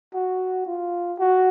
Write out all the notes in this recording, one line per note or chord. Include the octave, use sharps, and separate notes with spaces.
F#4
F4
F#4